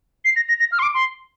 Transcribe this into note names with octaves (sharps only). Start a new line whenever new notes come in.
C7
A#6
A#6
A#6
F6
C6
D6
C6